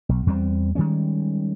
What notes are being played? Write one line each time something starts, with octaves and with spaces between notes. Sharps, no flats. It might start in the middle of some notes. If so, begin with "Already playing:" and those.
B1
E2 G3 A3 C4
D#3 G3 G#3 C#4